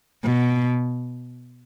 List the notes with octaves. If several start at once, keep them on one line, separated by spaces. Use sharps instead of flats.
B2